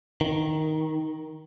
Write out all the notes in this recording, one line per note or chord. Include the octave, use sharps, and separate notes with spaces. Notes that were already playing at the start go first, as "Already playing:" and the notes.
D#3